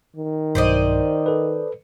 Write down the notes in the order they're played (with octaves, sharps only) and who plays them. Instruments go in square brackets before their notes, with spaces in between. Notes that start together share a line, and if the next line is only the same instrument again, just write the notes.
[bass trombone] D#3
[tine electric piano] B1 G2 [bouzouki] C5 D5 D#5
[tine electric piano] A4 B4